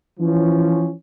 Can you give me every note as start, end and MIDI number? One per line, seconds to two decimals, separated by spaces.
0.19 0.91 52
0.19 0.91 53
0.19 0.91 61